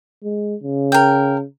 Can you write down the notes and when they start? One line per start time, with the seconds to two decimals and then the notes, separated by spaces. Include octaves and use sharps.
0.24 G#3
0.63 C#3
0.92 A#4 G5